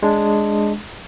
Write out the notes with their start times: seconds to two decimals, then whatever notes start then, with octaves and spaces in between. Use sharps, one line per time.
0.03 G#3 D4